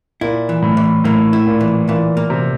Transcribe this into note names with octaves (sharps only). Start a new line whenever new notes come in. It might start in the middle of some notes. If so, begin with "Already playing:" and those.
A#2 E4
E3
A2
E3
A2 A#3
E4
A#2
E3
A#2 E3
A#3
C3